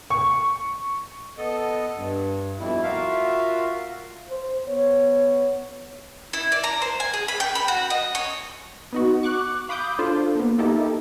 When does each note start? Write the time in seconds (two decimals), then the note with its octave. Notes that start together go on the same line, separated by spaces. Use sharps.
0.10 C#6
1.38 B3 A4 D#5
1.95 G2
2.59 F2 B2 G3 E4
2.83 F4 F#4 A#4 E5 F5
4.28 C5
4.66 B3 C#5
6.33 E4
6.52 D5
6.64 A#5
6.82 C5
7.00 G#5
7.14 G#4
7.28 B5
7.40 G5
7.55 B5
7.68 F#4
7.90 D#5
8.15 C#5
8.93 B3 D#4 F#4
9.23 C#6 D6 F#6
9.69 F5 B5 D6 D#6 G6
9.99 D4 F4 A4 C5
10.35 A#3 B3
10.58 A#3 D#4 E4 G4 A4